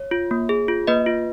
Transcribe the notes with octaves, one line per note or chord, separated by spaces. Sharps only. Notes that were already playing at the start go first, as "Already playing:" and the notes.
Already playing: C#5
F4
A#3
G#4
F4
A#3 B4 D#5
F4